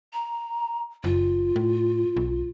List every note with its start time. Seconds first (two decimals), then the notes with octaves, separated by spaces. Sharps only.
0.13 A#5
1.04 F#1 F4
1.56 A2
2.16 B1